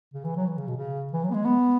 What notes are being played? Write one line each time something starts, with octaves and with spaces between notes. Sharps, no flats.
C#3
E3
F#3
E3
C#3
B2
C#3
E3
F#3
B3
G#3
B3